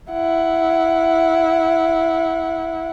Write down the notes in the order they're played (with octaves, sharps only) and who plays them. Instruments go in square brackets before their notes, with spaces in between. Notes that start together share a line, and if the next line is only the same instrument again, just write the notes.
[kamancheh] E4 F#5